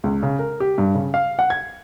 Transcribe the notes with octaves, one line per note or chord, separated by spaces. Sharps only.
C#2
C#3
A#4
G4
G2
C#3
F5
F#5
G#6